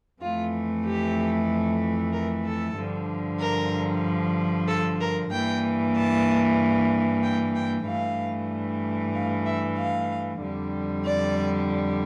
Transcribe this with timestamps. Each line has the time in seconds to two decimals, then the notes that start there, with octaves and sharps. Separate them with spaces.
0.22 F2 E3 A3 F4
0.86 G4
2.13 A#4
2.45 A4
2.77 G2 D3 F3
3.41 A#4
4.68 A4
5.01 A#4
5.32 G2 E3 A#3 G5
5.96 A5
7.23 G5
7.55 G5
7.87 G2 E3 A3 F5
9.15 F5
9.46 E5
9.78 F5
10.42 F2 D3 G3
11.06 D5